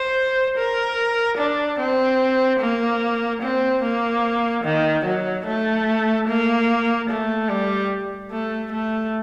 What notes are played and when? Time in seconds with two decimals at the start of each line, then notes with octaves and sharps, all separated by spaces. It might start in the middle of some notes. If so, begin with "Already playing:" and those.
Already playing: C5
0.57 A#4
1.37 D4
1.79 C4
2.60 A#3
3.42 C4
3.82 A#3
4.64 D#3
5.05 F#3
5.46 A3
6.27 A#3
7.09 A3
7.49 G3
8.30 A3
8.72 A3